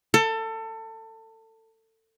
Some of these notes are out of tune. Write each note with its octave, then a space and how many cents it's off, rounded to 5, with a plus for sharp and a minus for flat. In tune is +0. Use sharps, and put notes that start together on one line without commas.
A4 +25